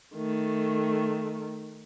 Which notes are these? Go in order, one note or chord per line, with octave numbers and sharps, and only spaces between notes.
D#3 A3